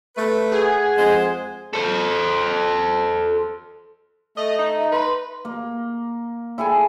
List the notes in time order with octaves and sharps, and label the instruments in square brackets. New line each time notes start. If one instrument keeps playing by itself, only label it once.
[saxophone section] A3 B4
[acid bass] G#4 [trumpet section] F#5 G#5
[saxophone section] F2 G#3 C5
[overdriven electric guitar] A4 C5
[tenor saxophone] A3 [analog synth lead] D#5 [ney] E5
[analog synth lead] D#4
[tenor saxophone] B4 [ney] C6
[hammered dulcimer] A#3
E4 G#4 A4 G#5